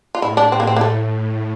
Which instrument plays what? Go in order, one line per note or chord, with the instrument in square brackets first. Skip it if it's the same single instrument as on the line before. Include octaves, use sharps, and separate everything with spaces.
[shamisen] F4
[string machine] A2 [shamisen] E4
[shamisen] D4
C4
A#3
C4
A#3
A3